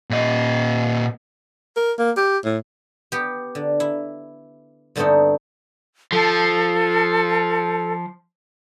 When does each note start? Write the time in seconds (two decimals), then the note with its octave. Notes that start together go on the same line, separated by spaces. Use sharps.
0.10 A#2 D#5
1.76 A#4
1.99 A#3
2.17 G4
2.45 A2
3.12 B3 G4
3.55 D3
3.80 E4
4.96 G2 D3 A3 B3 C4 D#4
6.12 F3 A4